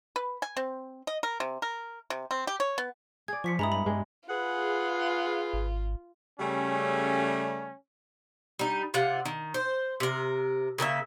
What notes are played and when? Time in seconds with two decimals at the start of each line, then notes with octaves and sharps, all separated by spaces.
0.16 B4
0.42 G#5
0.57 C4
1.07 D#5
1.23 A#4
1.40 C3
1.62 A#4
2.10 C3
2.31 C4
2.47 G4
2.60 C#5
2.78 B3
3.28 G#4 D5 G#6
3.44 F3 C#6 B6 C#7
3.59 G2 G#3 E4 A#5 B5 D#6
3.72 B3 B5
3.86 G2 G#3
4.29 F4 G#4 B4 F#5
5.53 G#1
6.40 C#3 G3 A3 C#4
8.59 G3 D#4
8.94 C3 F4 D5 F#5
9.25 D#3
9.54 C5
10.00 C3 A#4
10.78 C#3 A#3 G#4 E5